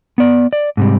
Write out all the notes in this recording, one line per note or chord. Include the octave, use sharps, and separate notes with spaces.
B3 D5
D5
G#2 C3 G3